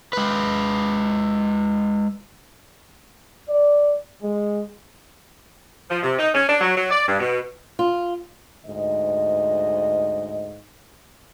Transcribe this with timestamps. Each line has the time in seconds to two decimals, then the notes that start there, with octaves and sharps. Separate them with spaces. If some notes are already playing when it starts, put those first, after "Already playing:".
0.13 G#3 B4
3.48 D5
4.22 G#3
5.90 F3
6.02 C3
6.19 D#4
6.34 C#4
6.48 D4
6.61 F#3
6.76 F#3
6.91 D5
7.07 G2
7.20 B2
7.79 F4
8.67 D2 G#2 D#5